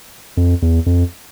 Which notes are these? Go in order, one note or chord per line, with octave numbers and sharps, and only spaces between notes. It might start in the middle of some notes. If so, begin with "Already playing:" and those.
F2
E2
F2